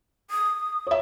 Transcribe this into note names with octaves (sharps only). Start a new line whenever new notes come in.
D#6
C#5 E5